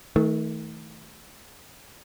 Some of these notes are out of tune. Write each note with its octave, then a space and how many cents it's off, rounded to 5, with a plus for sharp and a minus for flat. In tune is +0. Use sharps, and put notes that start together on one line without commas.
D#3 +40 A3 +0